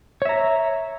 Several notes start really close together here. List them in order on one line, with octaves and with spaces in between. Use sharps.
C#5 E5 A#5